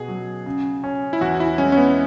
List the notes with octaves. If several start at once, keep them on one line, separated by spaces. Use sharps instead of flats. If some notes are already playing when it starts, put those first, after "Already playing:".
Already playing: B2 F#4 G#4
F#3
C#3
C#4
E4
E2 F#4
E4
G#3 C#4
C#4
B3